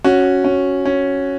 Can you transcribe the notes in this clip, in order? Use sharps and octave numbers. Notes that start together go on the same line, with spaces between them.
C#4 F#4
C#4
C#4